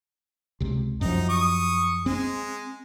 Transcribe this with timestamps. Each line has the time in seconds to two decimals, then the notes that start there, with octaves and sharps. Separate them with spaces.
0.60 C#2 C3
1.01 F#2 F3 D#4
1.29 C#6 D#6
2.06 G#3 C4